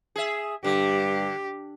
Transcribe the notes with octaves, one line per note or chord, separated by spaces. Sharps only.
G#4 E5
G2 D3 G4